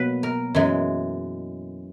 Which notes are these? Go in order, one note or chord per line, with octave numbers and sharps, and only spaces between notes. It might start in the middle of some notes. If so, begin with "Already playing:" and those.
Already playing: B2 F#3 A#3 B4
A#4
F#2 E3 G#3